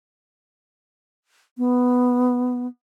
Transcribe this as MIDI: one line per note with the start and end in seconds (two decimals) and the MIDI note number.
1.58 2.67 59